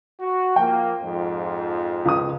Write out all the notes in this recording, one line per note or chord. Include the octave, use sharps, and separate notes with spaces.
F#4
F3 A#3 G5
F2 G#2 F3
C#2 D#6